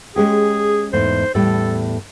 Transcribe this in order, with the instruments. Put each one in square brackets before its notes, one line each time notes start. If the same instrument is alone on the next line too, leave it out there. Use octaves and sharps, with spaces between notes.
[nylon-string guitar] G#3 C#4 G4 [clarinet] G#4
[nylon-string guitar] E2 G#2 A3 [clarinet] C5
[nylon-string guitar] E2 A2 G3 [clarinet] A4